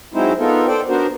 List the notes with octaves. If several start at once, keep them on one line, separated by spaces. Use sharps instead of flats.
F#3 G#3 C4 D#4 E4 C5
B3 D#4 F4 A4 A#4
A4 C5 D5 G5
B3 D4 F#4 A#4 C5